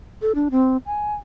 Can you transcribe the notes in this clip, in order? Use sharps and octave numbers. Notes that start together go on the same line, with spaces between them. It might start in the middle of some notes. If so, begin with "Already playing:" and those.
A4
D4
C4
G#5